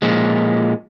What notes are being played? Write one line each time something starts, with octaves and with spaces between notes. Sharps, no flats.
A#2 F3 G#3